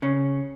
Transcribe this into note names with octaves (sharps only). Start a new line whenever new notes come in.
C#3 C#4